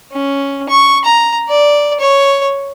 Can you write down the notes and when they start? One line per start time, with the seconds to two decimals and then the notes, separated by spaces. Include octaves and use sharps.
0.12 C#4
0.69 C#6
1.05 A#5
1.50 D5
2.00 C#5